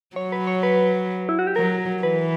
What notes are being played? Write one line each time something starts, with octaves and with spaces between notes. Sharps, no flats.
F#3 C#5
B4
C#5
B4
E4
F#4
G4
F#3 A#4
E3 B4